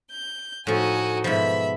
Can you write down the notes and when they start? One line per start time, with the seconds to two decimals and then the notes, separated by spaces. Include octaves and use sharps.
0.10 G6
0.67 A2 F3 D#4 F#4 G#5
1.24 G#2 B2 F3 E5 B5